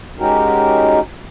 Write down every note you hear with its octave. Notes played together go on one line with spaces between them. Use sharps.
G#3 C#4 D#4 F#4 G4 A#4